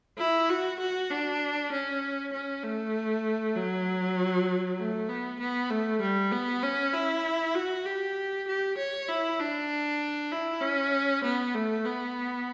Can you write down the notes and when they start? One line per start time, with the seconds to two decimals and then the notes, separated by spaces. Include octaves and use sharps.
0.18 E4
0.49 F#4
0.79 F#4
1.10 D4
1.72 C#4
2.33 C#4
2.63 A3
3.55 F#3
4.79 A3
5.09 B3
5.40 B3
5.70 A3
6.01 G3
6.32 B3
6.63 C#4
6.93 E4
7.55 F#4
7.85 G4
8.47 G4
8.77 C#5
9.08 E4
9.40 D4
10.32 E4
10.61 C#4
11.24 B3
11.54 A3
11.85 B3